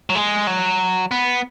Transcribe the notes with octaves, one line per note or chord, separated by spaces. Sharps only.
F#3
G#3
F#3
B3